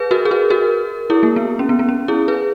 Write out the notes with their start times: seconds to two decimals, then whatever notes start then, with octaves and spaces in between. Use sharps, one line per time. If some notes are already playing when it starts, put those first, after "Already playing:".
Already playing: G#4 B4
0.11 F#4 A#4
0.25 G#4
0.31 F#4 A#4
0.50 F#4 A#4
1.10 E4 G#4
1.23 A#3
1.36 B3
1.59 C#4
1.69 B3
1.79 B3
1.89 C#4
2.08 E4 G#4
2.28 G#4 B4